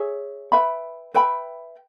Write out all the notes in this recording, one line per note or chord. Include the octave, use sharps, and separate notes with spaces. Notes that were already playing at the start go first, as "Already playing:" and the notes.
Already playing: G#4 C#5 E5
B4 E5 G5 B5
B4 E5 G5 B5